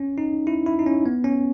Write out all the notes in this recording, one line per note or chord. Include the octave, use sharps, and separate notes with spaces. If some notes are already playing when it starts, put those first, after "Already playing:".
Already playing: C#4
D#4
E4
E4
D#4
C#4
B3
C#4